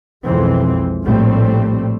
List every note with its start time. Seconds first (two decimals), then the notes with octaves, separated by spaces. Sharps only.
0.25 B1 F2 E3 G#3 C4
1.05 A#1 A2 G3 A3 C4